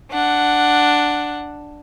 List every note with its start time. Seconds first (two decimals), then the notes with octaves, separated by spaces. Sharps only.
0.11 D4 F#5